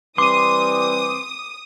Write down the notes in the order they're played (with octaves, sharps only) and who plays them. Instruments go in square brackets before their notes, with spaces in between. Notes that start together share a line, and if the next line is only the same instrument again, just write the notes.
[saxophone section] E3 G3 C4 [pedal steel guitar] C6 [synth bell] D6 D#7 [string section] D#6